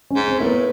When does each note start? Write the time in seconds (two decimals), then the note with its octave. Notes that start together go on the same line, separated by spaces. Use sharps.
0.10 C#4
0.16 G#2
0.28 C4
0.39 A2 A#3
0.46 B3